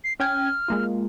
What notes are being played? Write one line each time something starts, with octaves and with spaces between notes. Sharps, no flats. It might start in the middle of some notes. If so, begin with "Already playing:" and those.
C7
C#4 G5 F6 G#6
G#3 A#3 F4